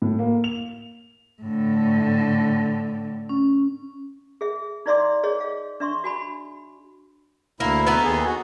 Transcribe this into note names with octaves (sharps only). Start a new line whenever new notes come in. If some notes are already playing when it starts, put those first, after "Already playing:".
A2
A#3
F7
A2 D3
C#4
G#4 E5
D#4 E4 D5 E5 C6 D6
G#4 C#5 D#5
F5
D4 E5 C6 C#6
F#4 G#5 B5
D2 A#3 E4
B3 D#4 A4
D#2 G#4
F#4